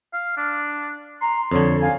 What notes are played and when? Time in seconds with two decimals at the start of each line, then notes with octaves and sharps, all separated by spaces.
0.13 F5
0.37 D4
1.21 A#5 C6
1.51 F2 D3 C#5
1.82 F5 G#5